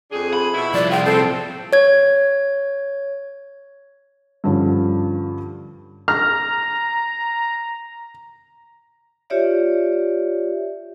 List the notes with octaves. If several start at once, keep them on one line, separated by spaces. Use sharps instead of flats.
F2 D4 G#4
B5
B2 E4
C2 F3 D5
F4 G#4 G5
C4 A4
C#5 G#6
G2 D3 F3 C#4
A#5 F6
F4 G4 C#5 D5 E5